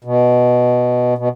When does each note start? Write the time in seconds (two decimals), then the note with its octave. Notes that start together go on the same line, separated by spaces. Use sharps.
0.04 B2
1.18 B2